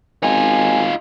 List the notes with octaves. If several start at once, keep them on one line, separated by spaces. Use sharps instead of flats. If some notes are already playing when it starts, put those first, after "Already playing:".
G#1 D#4 F4 G#5